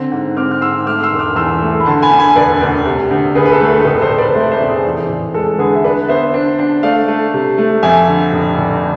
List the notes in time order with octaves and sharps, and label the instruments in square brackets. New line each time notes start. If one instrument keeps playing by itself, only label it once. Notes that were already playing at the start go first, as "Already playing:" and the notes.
Already playing: [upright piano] D3 C4
G#2
C4 D6 F6
F6
G#2 C6 E6
A3 D6 F6
C6 E6
E1
D6 F6
E2 C6 E6
A3
B5
D3 A5 C6
G#5 B5
D2
G#5 B5
E1 B4 D5
D2
C3
D2
D2 G#4 B4
B4
A4
A3
A4
F1 G#4 B4
A4 C5
F1
B4 D5
A3 C5 E5
C5 E5
F1
G#4
E2
F1
G#3 A4
D3 G#4 B4
E5
D4 B4 D5
B3 C5 E5
D4
D4
A3 D5 F5
A3
C3
A3
F2 E5 G#5
D3
F1
F1